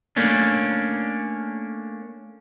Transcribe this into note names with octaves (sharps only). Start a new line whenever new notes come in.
A3 A#3 C#4 D4